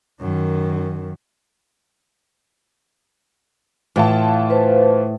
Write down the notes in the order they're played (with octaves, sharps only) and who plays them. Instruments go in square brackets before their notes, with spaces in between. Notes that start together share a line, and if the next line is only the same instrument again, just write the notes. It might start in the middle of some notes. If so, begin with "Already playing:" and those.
[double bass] F#2 D#3
[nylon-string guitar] A2 [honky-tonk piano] E3 F4 A5
[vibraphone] B4 C5